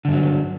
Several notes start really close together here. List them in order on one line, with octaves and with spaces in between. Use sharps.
D3 G2 F#3